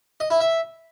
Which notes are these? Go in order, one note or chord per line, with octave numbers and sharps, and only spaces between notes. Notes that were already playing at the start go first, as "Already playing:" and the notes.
D#5
E4
E5